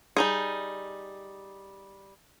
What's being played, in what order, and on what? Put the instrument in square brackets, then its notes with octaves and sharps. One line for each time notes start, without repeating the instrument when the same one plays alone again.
[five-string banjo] G3 D#4 G#4